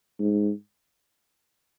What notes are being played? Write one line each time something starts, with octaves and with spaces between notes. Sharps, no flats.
G#2